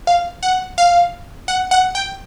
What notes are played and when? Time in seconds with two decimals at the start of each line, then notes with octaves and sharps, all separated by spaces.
0.07 F5
0.43 F#5
0.78 F5
1.48 F#5
1.71 F#5
1.95 G5